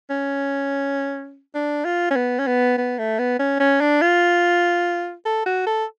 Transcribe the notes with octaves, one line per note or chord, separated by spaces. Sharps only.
C#4
D4
F4
C#4
B3
C#4
B3
B3
A3
B3
C#4
C#4
D4
F4
A4
F#4
A4